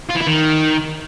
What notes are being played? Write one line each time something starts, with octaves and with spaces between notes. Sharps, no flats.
F4
E3
E4
D#3